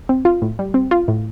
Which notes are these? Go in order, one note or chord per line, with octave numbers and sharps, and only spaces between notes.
C4
F4
A2
G3
C4
F4
A2